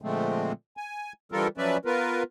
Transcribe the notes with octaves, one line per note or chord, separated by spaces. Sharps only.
A#2 D3 F3 G#3 A3 C4
G#5
D3 E3 G3 F4 A4 A#4
F3 F#3 C#4 B4 D5 E5
B3 F4 A#4 B4